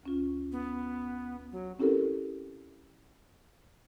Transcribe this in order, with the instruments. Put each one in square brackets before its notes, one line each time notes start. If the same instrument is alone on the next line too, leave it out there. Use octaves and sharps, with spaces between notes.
[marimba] D2 C#4 F4
[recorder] B3
F#3
[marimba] C4 C#4 E4 G4 A4 A#4